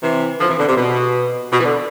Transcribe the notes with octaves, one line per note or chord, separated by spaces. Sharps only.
C3 E3
D3 F3
C3 E3
B2 D3
C3
B2
B2
E3
B2 D3